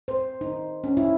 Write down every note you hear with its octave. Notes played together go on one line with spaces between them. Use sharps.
C5
D#4
C#4
E4